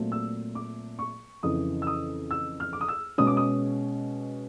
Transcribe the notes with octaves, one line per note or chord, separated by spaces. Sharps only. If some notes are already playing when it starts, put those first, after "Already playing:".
Already playing: A#2 F#3 A3 C4
E6
D6
C#6
F2 C#3 E3 D#6
E6
D#6
E6
F6
D6
D#6
E6
B2 G#3 C#4 D#6
D6
D#6